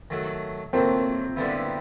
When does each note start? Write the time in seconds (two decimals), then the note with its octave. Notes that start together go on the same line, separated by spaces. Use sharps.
0.10 D#3 F#3 A3
0.73 D#3 F#3 A3 A#3 C4
1.36 G2 D3 G3 B3 E4